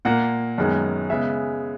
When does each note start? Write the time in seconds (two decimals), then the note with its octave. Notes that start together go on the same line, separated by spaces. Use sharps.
0.05 A#2 A#3 F#5
0.58 F#2 D#3 G#3 B3
1.10 C#3 G#3 B3 E5